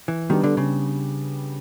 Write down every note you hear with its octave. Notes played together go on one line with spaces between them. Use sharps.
E3
D#3 G3 B3 D4 G4
D3
C#3